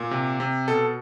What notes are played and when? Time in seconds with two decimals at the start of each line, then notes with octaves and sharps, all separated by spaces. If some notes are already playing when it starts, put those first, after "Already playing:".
Already playing: A#2
0.11 C3
0.40 C3
0.68 B2 A4